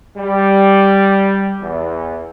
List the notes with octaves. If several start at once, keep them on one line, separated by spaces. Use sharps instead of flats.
G3
E2